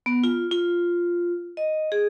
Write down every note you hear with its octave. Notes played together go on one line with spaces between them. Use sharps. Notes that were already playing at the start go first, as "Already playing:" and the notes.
B3
F4
F4
D#5
G#4